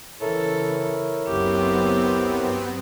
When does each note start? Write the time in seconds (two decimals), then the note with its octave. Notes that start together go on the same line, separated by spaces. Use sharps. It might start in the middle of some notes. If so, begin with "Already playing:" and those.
0.21 C#3 E3 E4 A4 A#4 C#5
1.27 F#1 C#2 F#2 B3 C4 G4
2.40 G2 F#3